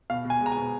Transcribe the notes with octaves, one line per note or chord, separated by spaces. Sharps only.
B2 F5
B2
G#5
G#3
A#5
G#5
B2